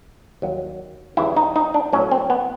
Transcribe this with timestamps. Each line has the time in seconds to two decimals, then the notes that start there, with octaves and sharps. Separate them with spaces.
0.42 D#2 D#3 F#3
1.17 D#2 C#3 E3 G3 E4
1.37 D#4
1.56 D#4
1.74 D4
1.93 A2 F#3 C#4
2.11 C4
2.30 B3